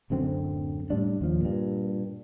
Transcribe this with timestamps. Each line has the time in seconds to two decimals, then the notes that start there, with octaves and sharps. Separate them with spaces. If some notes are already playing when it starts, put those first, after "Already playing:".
0.10 D1 F#2 D3 C4
0.90 A2 G3 D4
1.21 D#2 F3
1.41 G2 A#2